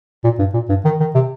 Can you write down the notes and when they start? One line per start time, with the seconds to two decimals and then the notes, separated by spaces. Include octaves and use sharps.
0.24 A#2
0.39 G2
0.54 A#2
0.69 G2
0.85 D#3
1.00 D#3
1.15 C3